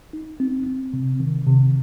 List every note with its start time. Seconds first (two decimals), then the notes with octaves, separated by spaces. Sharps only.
0.13 D#4
0.40 C4
0.66 C4
0.93 C3
1.20 D#3
1.47 C3